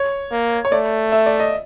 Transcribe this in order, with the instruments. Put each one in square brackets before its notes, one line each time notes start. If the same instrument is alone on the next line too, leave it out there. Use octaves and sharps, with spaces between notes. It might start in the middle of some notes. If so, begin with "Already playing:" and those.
Already playing: [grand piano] C#5
[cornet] A#3
[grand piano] C#5
[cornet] A3 [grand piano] D5
[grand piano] E5
D5
D#5